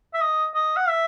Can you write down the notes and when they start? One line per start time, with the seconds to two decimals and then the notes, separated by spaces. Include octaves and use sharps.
0.14 E5
0.22 D#5
0.55 D#5
0.77 F#5
0.88 E5